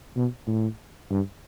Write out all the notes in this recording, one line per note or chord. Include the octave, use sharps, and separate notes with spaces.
B2
A2
G2